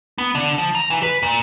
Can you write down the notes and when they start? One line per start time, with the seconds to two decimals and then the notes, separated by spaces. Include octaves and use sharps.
0.18 B3
0.35 D3
0.58 F3
0.75 A#5
0.90 E3
1.03 B4
1.23 A#2